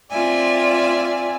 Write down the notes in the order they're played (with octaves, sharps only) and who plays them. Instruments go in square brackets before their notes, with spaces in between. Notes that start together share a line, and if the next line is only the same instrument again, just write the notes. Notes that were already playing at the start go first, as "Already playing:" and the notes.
[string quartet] C4 F4 D5 E5 G#5